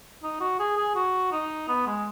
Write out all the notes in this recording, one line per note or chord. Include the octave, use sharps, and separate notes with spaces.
D#4
F#4
G#4
G#4
F#4
D#4
B3
G#3